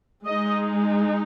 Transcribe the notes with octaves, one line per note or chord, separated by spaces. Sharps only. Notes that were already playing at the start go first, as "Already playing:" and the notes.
G#3 D#4 D#5